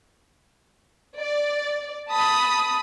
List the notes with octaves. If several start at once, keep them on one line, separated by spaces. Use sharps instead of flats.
D5
A5 B5 D#6